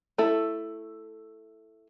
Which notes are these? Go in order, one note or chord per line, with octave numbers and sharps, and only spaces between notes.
A3 E4 A4